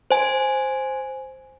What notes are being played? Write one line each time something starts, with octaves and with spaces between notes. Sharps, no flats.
C5 G#5